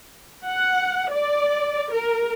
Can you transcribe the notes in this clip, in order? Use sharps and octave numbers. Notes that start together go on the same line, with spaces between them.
F#5
D5
A#4